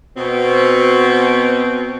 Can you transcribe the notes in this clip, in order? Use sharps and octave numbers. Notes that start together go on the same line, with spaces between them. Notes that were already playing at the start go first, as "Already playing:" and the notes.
B2 C4